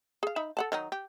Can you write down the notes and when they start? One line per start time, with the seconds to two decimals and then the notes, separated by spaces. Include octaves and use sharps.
0.23 G#4 F5
0.36 D#4 E5 B5
0.57 A4 F#5 A5
0.72 D#3 F#3 D#4
0.92 G4